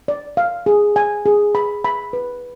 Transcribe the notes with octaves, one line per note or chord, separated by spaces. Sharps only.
D5
F5
G#4
G#5
G#4
B5
B5
B4